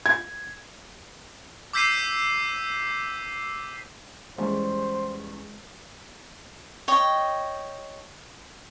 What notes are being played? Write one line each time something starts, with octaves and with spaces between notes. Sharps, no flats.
G#6
D6 E6 G6 B6 C7 D#7
E2 G3 G#3 C#4 C5
C#5 D#5 G5